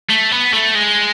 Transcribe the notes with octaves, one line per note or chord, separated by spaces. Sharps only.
A3
B3
A3
G#3